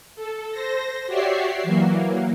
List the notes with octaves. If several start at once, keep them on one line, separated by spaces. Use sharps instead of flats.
A4
C5 A#6
F#4 G4 C#5 D5 E5 C7
E3 F#3 A#3